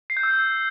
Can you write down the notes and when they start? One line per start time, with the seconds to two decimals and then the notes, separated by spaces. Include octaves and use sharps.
0.10 C7
0.17 G6
0.23 E6